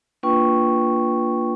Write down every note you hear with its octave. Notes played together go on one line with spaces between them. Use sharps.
A#3 D4 F4 B4 G5 C#6